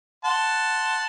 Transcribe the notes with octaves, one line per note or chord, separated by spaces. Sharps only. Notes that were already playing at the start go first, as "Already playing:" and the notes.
F#5 A5 C6